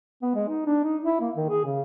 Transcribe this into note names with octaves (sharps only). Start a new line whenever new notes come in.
B3
G#3
D#4
D4
D#4
E4
A#3
D#3
G#4
C#3